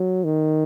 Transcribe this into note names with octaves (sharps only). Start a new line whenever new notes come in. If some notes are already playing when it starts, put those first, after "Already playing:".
Already playing: F#3
D#3